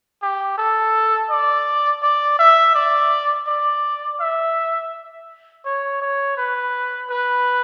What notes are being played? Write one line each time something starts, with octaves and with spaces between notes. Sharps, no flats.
G4
A4
D5
D5
E5
D5
D5
E5
C#5
C#5
B4
B4